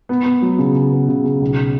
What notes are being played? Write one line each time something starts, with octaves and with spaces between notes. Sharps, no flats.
B3
B3
F#3
C#3
C#3
B3
C#3
C#3
B1